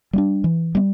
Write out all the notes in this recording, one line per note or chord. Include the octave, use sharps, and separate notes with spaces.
G3 B3 D4
E3
G3 B3